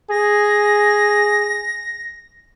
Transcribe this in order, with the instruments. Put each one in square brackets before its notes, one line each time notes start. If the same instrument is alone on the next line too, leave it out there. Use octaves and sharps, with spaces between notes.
[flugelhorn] G#4 [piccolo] A#6